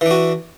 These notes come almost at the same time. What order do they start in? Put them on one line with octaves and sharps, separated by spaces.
E3 D4 F#4